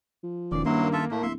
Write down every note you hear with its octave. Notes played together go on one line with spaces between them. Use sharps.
F3
E1 D#3 C#4 D#4 D5
G2 F#3 A#3 E4 C6
F4 A4 E5
A2 A3
D1 E4 E5 C6